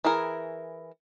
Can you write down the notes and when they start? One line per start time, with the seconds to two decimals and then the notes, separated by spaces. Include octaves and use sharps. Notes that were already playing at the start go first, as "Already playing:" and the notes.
0.05 E3 E4 G#4 A#4